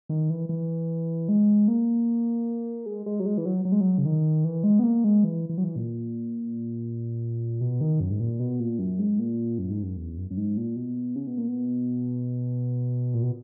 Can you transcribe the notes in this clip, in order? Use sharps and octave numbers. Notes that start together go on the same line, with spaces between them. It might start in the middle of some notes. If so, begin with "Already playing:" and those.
D#3
E3
E3
G#3
A#3
G#3
G#3
F#3
G#3
E3
F#3
F#3
G#3
F#3
C#3
D#3
E3
G#3
B3
A#3
G#3
E3
E3
F#3
E3
A#2
B2
D#3
F#2
G#2
A#2
B2
A#2
F#2
G#2
A#2
F#2
G#2
F#2
E2
F#2
F#2
G#2
A#2
B2
C#3
B2
A#2
B2
A#2
B2